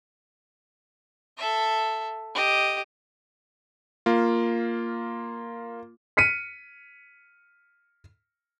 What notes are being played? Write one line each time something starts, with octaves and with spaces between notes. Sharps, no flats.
A4 E5
G4 D#5
A#3 F4
F6 B6 C#7 D#7